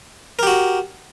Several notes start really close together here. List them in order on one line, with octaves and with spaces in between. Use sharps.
A#4 G4 F#4